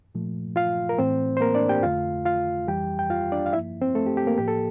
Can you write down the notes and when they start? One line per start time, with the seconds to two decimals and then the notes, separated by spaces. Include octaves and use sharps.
0.15 A#2 F3 A3
0.56 F4 F5
0.89 A#4
0.98 A2 E3 A3 C4 C5
1.37 C5
1.41 A#3 A#4
1.55 D4 D5
1.69 G4 G5
1.83 F2 D3 A3 F4 F5
2.25 F4 F5
2.68 F2 E3 G3 G4 G5
2.99 G5
3.10 F4 F5
3.32 D4 D5
3.46 F5
3.53 G2 F3 A#3 E4 E5
3.81 C4 C5
3.95 A3 A4
4.07 G4
4.17 G4
4.27 A#3 A#4
4.38 A2 F3 A#3 G4
4.48 A4